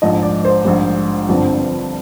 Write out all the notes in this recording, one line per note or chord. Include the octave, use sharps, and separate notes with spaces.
A#1 G#2 F3 D#5
D5
C5
A#1 G#2 G3
G1 G2 D3 F3 C4